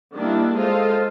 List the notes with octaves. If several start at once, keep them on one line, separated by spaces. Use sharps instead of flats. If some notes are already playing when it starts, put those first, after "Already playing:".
D#3 G3 A#3 D4 E4
G#3 F4 A4 C5 D#5 F5